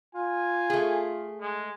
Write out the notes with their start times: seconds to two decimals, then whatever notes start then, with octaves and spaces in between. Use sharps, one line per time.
0.15 F4 G#5
0.70 A3 G#4
1.40 G#3